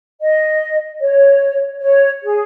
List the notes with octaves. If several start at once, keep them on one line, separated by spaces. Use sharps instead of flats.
D#5
C#5
C#5
G#4